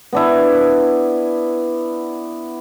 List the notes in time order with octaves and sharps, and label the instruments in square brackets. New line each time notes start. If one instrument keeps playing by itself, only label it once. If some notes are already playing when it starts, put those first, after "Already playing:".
[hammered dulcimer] B3 D4 E4